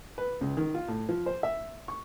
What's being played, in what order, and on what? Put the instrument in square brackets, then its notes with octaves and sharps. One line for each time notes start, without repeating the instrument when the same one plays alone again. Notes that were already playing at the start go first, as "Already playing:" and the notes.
[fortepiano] B4
C#2
D#3
F4
A2
F3
C5
E5
C#6